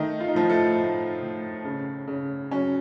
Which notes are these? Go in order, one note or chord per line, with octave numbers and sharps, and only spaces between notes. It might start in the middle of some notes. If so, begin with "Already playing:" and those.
Already playing: D#3 A3 D#4
F4
D#4
A2 F3 F4
A3 A4
A3
A2
C#3
C#3
F#3 C#4